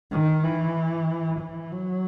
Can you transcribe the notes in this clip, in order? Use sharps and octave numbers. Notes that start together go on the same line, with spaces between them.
D#3
E3
E3
F#3